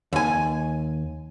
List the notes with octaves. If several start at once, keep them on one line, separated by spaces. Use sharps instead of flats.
D#2 G#5